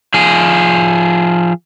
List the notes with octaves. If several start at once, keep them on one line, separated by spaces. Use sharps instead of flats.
F3 G#4